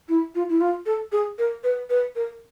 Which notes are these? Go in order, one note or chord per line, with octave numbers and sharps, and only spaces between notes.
E4
F4
E4
F4
A4
G#4
A#4
B4
B4
A#4